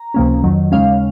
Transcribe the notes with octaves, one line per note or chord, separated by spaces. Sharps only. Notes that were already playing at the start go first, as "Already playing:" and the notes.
Already playing: A#5
C#2 C3 F3 A#3 C#4
F2 D#3 F#3
D#2 C#3 G#3 C#4 F5